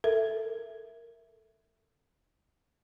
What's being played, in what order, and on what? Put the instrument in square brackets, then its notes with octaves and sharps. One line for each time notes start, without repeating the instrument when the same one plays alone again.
[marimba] A4 A#4 E5